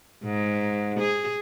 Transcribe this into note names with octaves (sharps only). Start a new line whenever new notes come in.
G#2
G#4